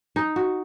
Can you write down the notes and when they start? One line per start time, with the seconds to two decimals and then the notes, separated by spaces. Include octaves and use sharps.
0.16 D#4
0.36 F#4